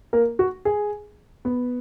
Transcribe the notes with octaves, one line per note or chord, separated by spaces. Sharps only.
A#3 A#4
F#4
G#4
B3 B4